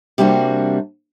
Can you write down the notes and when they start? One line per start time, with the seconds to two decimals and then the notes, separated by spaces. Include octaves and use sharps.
0.18 C3 G3 A#3 B3 D4 F#4